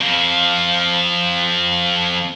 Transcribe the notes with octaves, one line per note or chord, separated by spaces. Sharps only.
F2 F3